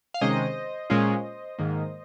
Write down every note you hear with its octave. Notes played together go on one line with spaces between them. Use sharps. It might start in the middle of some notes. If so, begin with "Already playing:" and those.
F5
C3 D#3 G#3 C#4 C5 D#5
A#2 G#3 C#4 F4
G#2 D#3 A#3